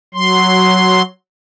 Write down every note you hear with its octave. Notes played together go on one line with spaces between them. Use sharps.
F#3 C6